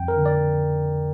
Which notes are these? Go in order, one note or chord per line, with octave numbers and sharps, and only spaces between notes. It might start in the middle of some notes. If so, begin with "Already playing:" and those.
Already playing: F2 G5
A#4
D3
D5